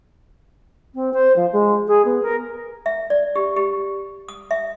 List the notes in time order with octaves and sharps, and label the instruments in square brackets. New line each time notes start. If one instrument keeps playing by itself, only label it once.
[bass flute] C4
C5
F3
G#3
G#4
B3
A#4
[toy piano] E5
D5
G4
G4
D#6
E5